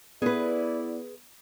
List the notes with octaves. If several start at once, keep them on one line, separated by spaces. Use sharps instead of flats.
B3 E4 G#4 B4 D5